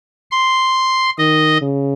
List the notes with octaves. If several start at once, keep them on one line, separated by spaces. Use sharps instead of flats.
C6
D#3 D#5
C#3